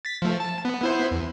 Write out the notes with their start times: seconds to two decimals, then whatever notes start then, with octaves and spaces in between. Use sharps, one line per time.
0.05 A6 B6
0.22 F3 A3
0.40 A5
0.65 B3
0.81 B3 E4 C5
1.11 E2